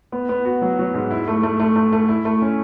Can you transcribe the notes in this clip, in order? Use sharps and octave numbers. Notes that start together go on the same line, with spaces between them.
B3
B3
F#4
F#3
F#3
G#2
E4
A3
A3
A3
A3
A3
E4
A3
C#4